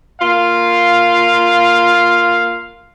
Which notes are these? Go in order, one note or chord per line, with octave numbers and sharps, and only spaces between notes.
A#3 F4 F5